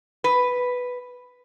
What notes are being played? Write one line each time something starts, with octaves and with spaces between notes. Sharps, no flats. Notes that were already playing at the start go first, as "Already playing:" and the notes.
B4